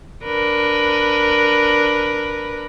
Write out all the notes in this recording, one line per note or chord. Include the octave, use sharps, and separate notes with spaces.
D4 A#4 B4